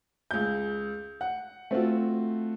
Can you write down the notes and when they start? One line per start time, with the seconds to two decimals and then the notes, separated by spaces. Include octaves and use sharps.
0.31 C#2 G6
1.21 F#5
1.71 A3 C4 F4 F#4